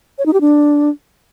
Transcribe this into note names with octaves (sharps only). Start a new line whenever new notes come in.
C#5
D#4
G4
D4